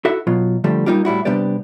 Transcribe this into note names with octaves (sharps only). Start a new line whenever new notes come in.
E4 F#4 A4 E5
B2 F#3 F4
D3 F3 G3 A3
G3 A#3 D#4 F4 G4
A2 G3 E4 F#4
C3 G3 B3 D4 G4 D5